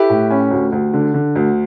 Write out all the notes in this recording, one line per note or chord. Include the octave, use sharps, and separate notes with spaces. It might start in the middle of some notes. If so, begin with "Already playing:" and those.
Already playing: E4 G4 A4 B4
A2
C#4
D2
D2
D3
D3
D2